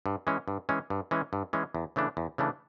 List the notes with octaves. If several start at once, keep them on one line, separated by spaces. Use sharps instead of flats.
G2
E3 G#3 C#4
G2
E3 G#3 C#4
G2
E3 G#3 C#4
G2
E3 G#3 C#4
E2
C#3 E3 A3 D4
E2
C#3 E3 A3 D4